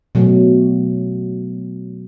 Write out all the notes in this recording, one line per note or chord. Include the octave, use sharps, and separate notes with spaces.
B2 F#3 A3